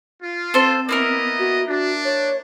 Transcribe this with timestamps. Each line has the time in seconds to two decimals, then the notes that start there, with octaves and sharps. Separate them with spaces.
0.22 F4
0.54 C4 A4 C5
0.89 A#3 B3 E4 A#4 D#5
1.39 F#4
1.68 D4 F#4
2.05 C#5